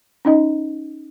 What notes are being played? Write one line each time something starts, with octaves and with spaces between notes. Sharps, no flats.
C#4 D#4 D#5